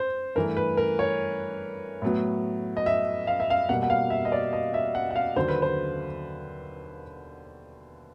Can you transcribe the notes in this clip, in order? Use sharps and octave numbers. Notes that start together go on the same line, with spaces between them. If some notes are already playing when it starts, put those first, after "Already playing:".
Already playing: C5
G2 E3 A3 A#4
B4
A#4
C#5
A2 F#3 B3
D#5
E5
F5
E5
F5
B2 G3 A#3 F#5
F#5
F5
E5
D#5
D5
D#5
E5
F#5
F#5
F5
D#2 D3 F#3 C5
B4
C5